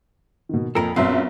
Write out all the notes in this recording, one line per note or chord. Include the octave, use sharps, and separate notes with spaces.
B2 D#3
A#1 F2 A4 A#4
A#1 F#2 B3 C4 D4 E5